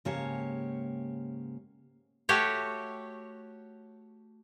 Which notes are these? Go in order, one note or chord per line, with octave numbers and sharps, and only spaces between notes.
G#2 C#3 A#3 G4 C#5 A5
A3 F#4 G4 C#5